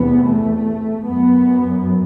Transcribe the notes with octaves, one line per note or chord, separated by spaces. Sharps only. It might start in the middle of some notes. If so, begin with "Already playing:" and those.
Already playing: E2 C3 B3
A3
F#2 B3